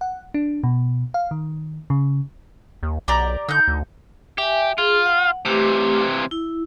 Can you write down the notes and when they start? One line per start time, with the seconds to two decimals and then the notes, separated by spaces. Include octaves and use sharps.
0.01 F#5
0.34 D4
0.64 B2
1.14 F5
1.31 D#3
1.90 C#3
2.83 D#2
3.08 B1 G4 D5 A#5
3.49 D3 D#4 G6
3.68 D2
4.38 G4 E5 G#5
4.78 F4 G#4
5.06 F#5
5.45 C3 E3 A3 G4 D6
6.31 E4